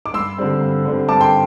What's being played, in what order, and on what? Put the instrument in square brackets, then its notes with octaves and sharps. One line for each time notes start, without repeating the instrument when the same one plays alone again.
[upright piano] D6
G2 C6 E6
D3 G3 C4
G2
D3 G3 C4
G2 A5 D6
G5 C6